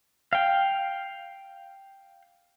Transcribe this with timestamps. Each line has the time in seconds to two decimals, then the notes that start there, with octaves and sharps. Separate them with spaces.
0.33 F5 G5